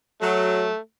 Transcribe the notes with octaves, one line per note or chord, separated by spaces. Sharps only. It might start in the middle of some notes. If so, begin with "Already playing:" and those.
F#3 A3